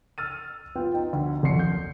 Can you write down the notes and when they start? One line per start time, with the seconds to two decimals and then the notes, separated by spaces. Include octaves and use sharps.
0.18 E6 F6 A6 D#7
0.75 B3 F4 G5
0.94 D#4 G5
1.13 D2
1.43 G#1 F2 C6 C7 C#7
1.59 G6